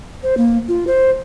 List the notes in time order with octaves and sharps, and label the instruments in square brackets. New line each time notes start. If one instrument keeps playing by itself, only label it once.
[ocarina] C5
A#3
F4
C5